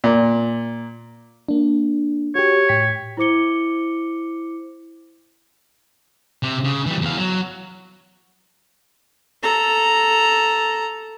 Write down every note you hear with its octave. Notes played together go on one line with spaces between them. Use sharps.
A#2
A#3 D4
F#4 G4 C#5
A2 G5 B6
E4 C5 D6 C#7 G7
C3
C#3
E3 G3
E2 F5
F#3
A4 A#5